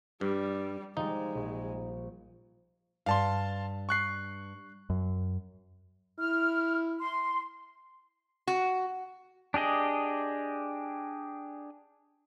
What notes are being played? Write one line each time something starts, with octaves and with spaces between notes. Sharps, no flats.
G2 G3
F3 G3 G#3 D#4
A#1
G2 F5 A5 C6
C#6 F#6 C7
F#2
E4 F6
C6
F#4
D4 G4 G#4 D#5